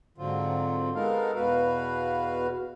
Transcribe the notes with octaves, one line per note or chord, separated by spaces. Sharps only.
G#2 D3 F#3 C4 F4
G#3 B3 D#4 A4 A#4 F5
E2 B2 F#4 B4 F5